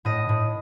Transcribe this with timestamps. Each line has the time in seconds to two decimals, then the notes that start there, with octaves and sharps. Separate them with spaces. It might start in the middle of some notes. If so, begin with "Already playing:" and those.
0.05 A2 D#5
0.29 A2